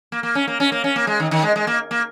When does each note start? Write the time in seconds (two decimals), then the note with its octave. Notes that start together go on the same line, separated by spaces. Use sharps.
0.12 A#3
0.23 A#3
0.35 C#4
0.47 A#3
0.60 C#4
0.72 A#3
0.84 C#4
0.96 A#3
1.07 G#3
1.20 D#3
1.31 D#3
1.43 G#3
1.56 G#3
1.67 A#3
1.91 A#3